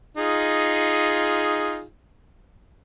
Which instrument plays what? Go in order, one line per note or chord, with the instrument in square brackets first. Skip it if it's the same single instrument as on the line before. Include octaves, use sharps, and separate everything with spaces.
[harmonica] D#4 F4 G#4